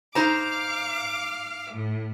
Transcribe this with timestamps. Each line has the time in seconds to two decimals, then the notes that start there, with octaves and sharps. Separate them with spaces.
0.15 D#4 C5 F5 A#5 D6
1.70 A2